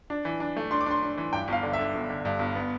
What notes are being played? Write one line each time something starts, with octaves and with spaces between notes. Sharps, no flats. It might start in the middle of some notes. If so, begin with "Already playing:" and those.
D4
E3
D4
A3
D4 C6
D6
D4 C6
D4
E3
G2 G5
G1 F5
D3
E5
D3
G1
D3
G2
G1
B3